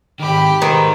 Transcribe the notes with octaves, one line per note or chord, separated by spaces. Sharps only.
G#2 D#3 G4 B5
D#3 G#3 C5